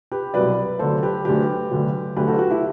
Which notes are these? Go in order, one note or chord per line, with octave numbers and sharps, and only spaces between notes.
G4 B4
C2 B2 F#3 B4 D5
D2 D3 F#3 A4 C5
G4 B4
D2 D3 F#3 G4 B4
D2 D3 F#3
D2 D3 F#3 G4 B4
F#4 A4
F#4
E4 G4